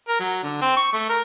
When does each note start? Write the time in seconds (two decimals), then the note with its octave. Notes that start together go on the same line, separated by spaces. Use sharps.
0.09 A#4
0.20 F#3
0.43 D3
0.61 C4
0.77 C#6
0.93 A3
1.09 A#4